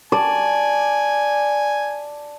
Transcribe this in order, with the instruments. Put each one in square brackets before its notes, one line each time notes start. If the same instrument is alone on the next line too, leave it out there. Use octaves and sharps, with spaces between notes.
[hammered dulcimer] D5 [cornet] G#5 [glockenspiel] A5